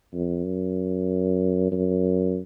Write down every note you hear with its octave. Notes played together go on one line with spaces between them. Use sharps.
F2
F#2
F#2